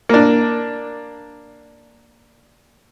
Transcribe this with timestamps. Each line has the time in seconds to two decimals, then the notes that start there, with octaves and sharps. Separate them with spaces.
0.09 A#3 D4